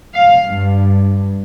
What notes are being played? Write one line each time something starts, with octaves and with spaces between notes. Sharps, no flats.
F5
G2